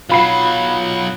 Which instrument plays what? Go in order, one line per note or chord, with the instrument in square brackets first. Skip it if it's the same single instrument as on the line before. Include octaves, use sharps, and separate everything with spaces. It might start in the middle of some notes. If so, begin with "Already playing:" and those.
[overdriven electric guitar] B1 F#3 [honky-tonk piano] F4 B5 C7